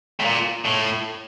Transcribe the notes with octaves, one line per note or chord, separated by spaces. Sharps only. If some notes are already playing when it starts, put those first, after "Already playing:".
A2
A#2
A2